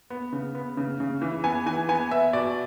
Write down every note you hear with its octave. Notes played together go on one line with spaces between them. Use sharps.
B3
C#3
B3
C#3
C#3
E3
B3 G#5
E3 G#5
B3 G#5
B3 E5
B2 D5